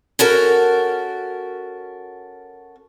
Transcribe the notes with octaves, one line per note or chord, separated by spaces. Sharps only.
C#4 F#4 A4 A#4